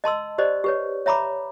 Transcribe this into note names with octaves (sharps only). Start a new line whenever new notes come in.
D#5 A5 C6 E6
G4 C5 D5 D#5
G4 B4 C#5
C#5 E5 A#5 B5 D6